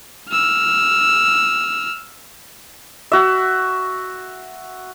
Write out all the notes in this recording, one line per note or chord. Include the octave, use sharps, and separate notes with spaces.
E6 F6
F#4 E5